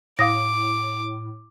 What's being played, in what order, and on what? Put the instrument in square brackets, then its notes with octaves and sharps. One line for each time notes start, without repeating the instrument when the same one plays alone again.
[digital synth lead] A2 [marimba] F5 D#6 A#6 [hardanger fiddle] D6